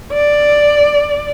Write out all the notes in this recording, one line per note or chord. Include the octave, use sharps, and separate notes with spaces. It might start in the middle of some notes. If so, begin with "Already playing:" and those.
D5